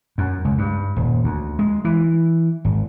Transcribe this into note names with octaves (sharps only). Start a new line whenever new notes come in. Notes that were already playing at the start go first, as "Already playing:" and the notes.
F#2
C#2
G2
D#1
D2
G#3
E3
G#1